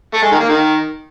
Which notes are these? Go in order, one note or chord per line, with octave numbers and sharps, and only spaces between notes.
A3
G#3
D#3
A#3
D#3